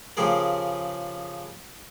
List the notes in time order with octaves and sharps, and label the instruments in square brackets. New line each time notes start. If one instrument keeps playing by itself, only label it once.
[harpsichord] C#3 F3 G4 G#4 A#4